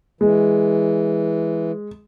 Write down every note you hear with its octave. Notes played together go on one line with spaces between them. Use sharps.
E3 G#3